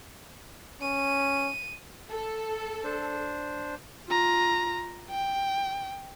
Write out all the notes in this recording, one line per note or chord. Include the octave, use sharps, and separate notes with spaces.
C#4 D#7
A4
D4 C5
F4 A#5
G5